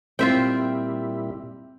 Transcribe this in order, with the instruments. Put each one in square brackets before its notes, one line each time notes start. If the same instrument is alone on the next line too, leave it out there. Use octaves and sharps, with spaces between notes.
[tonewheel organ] A#2 G3 E4 [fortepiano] C4 [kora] F4 E5 G5